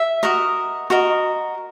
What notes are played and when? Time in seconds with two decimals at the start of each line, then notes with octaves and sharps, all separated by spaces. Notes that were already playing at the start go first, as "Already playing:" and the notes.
Already playing: E5
0.23 F#4 A#4 D#5
0.90 F#4 A#4 D#5